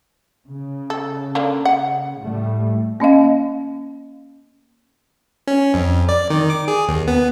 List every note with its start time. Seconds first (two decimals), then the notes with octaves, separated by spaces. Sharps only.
0.48 C#3
0.90 A4
1.35 D3 A#3 D4
1.65 F#5
2.22 A2 G3 A3
3.00 A#3 C#4 D#5 F5
5.47 C#4
5.74 F2
6.09 D5
6.30 D#3
6.50 D6
6.68 G#4
6.88 D#2
7.08 B3